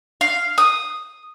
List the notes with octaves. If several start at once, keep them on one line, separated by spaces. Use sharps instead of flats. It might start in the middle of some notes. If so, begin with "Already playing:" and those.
F5
D#6